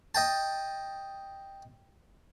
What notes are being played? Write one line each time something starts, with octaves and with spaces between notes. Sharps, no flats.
D#5 G5 A5